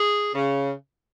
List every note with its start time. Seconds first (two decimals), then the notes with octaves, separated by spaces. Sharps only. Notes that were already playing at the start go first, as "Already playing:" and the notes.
Already playing: G#4
0.34 C#3